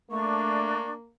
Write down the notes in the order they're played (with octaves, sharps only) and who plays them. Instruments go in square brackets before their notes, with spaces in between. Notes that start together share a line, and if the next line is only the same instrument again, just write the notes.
[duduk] A3 [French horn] A#3 [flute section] D4 [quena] C#6